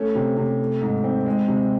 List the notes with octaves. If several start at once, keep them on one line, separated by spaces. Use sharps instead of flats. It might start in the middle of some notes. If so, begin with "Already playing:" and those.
Already playing: A3 C#4
C3
C3
A3
G#2
C4
G#3
C3